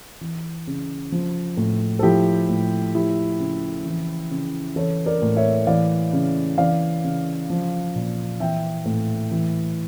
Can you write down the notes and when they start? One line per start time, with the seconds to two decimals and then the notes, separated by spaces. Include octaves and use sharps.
0.21 E3
0.67 C#3
1.12 F3
1.57 A2
1.99 A4
2.03 F3 E4 G4
2.48 A2
2.94 F3 E4 G4
3.39 C#3
3.85 E3
4.31 C#3
4.76 E3 A4 C#5
5.06 A#4 D5
5.22 A2
5.37 C#5 E5
5.67 E3 D5 F5
6.13 C#3
6.58 E3 D5 F5
7.04 C#3
7.50 F3
7.95 A#2
8.40 E3 E5 G5
8.85 A2
9.31 E3